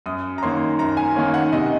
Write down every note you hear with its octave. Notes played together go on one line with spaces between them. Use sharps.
F#2 D#6
A#5
D#3 A#3 C#4 C6
F#2 A#5
G#5
D#3 A#3 C#4
F#5
C3 D#5